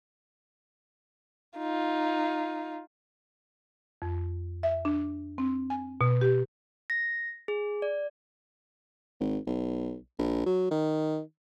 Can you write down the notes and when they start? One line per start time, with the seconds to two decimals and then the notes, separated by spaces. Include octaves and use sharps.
1.58 D#4 F4
4.02 F2
4.63 E5
4.85 D4
5.38 C4
5.70 G#5
6.01 B2
6.21 G4
6.90 A#6
7.48 G#4
7.82 D5
9.20 G#1
9.47 B1
10.19 A#1
10.46 F#3
10.71 D#3